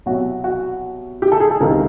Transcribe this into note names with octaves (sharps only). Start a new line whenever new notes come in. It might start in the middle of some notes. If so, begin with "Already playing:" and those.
C2 B2 F#3 F#4
F#4
G4
A4
G#4
A4
C#2 C3 D#3 A#4